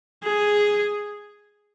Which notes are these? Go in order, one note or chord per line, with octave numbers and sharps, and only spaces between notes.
G#4